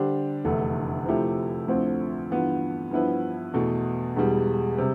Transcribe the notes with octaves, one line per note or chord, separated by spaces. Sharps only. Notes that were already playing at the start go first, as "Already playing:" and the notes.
Already playing: D3 G3 D4 G4 C5
F1 E2 D3 A3 E4
C3 F3 A3 E4 G4
D2 D3 F3 C4 E4
G2 E3 B3 F4
G2 F3 B3 E4 B4
E2 B2 A3
E1 E2 B2 G3
C3 G3